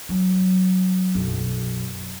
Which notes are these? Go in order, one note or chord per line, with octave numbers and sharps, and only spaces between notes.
F#3
B1 F#2